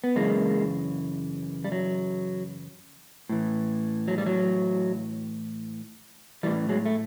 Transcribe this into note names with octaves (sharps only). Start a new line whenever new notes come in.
B3
F#2 C#3 E3 G#3 A#3
G3
F#3
A2 E3
F#3
G3
F#3
A2 E3 G3
F#3 G#3
A3